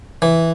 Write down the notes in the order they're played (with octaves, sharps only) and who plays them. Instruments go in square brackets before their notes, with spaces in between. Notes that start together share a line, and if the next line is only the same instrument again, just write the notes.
[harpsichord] E3